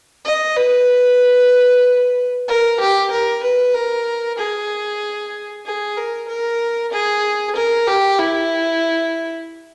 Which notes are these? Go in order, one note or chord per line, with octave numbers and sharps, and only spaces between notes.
D#5
B4
A#4
G4
A#4
B4
A#4
G#4
G#4
A#4
A#4
G#4
A#4
G4
E4